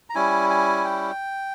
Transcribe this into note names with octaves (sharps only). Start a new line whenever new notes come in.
A#5
G3 C#4 E4 G#5
G#5
G5